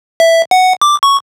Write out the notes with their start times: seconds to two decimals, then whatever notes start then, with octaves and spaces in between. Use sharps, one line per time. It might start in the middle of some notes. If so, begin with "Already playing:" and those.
0.20 E5
0.51 F#5
0.81 D6
1.03 C#6